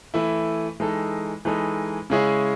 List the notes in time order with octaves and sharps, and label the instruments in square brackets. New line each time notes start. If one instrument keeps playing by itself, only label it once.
[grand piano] E3 A3 E4
E3 G#3 D#4 A4
E3 G#3 D#4 A4
C#3 G#3 C#4 E4 G#4